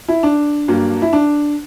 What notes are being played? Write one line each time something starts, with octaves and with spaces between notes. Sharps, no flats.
E4
D4
G2 F#3 A#3
E4
D4